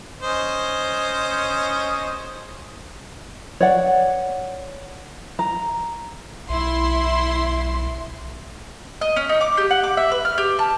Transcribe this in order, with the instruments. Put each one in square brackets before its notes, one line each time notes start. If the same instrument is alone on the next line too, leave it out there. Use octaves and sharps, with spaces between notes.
[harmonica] C#4 C5 D#5
[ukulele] C#5 D5 F#5
A#5
[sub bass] B1 [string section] E4 C6
[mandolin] D#5
C#4
D#4
D6
G4
F#5
D6
E5
B4
F6
G4
A5